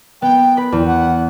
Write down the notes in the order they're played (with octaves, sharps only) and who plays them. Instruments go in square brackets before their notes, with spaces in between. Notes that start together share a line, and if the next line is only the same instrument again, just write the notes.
[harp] B3 [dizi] G5
[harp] B4 B5
E2
[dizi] F#5